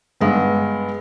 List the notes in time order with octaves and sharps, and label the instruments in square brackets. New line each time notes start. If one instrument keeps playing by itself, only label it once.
[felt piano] G2 G#3 B3